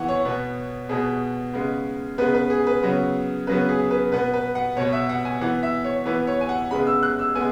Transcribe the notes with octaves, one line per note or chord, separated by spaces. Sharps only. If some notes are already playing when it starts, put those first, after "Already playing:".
Already playing: E3 B3 F#5 G#5 C#6
C#5
B2 B3
B2 B3 G#4
C#3 G#3 B3
C#3 G#3 B3 B4
B4
G#4
B4
C#3 F#3 B3
C#3 F#3 B3 B4
G#4
B4
B2 B3 B4
B4
F#5
B2 B3 C#5
E5
F#5
G#5
E3 B3 F#5
E5
C#5
E3 B3 B4
C#5
G#5
F#5
C#3 G#3 B3 B5
E6
F#6
E6
G#3 B3 G#5